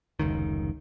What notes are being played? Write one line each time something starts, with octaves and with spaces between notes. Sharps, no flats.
F1 C#2 D#3